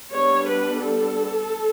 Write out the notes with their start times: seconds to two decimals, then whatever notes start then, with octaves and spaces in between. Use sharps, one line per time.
0.13 G3 B3 D4 C#5
0.47 B4
0.81 A4